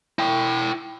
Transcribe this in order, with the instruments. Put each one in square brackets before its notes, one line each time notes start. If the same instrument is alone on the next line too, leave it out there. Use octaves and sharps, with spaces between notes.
[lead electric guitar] E4 G5